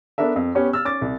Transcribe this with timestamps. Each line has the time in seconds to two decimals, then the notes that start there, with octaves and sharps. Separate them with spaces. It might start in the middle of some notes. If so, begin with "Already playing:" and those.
0.18 B3 D4 A4 A#4 E5
0.36 F2
0.55 B3 C#4 G4 C#5
0.73 E6 F6 A6
0.85 C#4 D6 A6
1.01 C2